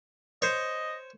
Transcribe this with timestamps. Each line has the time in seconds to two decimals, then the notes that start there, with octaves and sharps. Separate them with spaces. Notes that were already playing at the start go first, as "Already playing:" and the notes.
0.42 C5 C#5 D#5